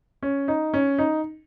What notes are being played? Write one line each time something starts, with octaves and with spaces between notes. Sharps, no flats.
C#4
D#4
C#4
D#4